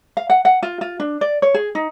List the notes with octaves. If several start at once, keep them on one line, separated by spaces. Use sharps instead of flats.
F5
F#5
F#5
F4
F4
D4
D5
C#5
G#4
D#4